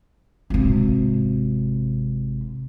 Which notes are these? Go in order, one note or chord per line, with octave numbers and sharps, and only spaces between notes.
G#1 C3